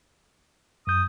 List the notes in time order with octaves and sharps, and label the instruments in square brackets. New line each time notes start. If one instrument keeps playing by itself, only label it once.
[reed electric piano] F#2 G6 [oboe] D#6